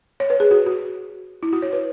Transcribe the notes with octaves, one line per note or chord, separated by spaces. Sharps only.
C#5
B4
G#4
F#4
F#4
E4
F#4
C#5
B4